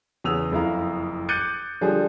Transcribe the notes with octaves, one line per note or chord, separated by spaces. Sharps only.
E2 C#3 D#6 E6 F7
F#1 F2 E4 F5 A#5
D6 F#6 G6 A6 C#7 D#7
D3 F3 G3 G#4